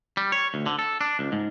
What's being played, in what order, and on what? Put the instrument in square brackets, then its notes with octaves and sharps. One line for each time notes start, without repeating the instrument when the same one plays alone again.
[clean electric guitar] G3
C#5
D2
D3
A4
D4
C#2
G#2